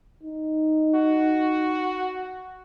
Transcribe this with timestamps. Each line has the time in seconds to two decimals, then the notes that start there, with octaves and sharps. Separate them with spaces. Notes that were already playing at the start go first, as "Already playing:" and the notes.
0.23 D#4
0.95 F#4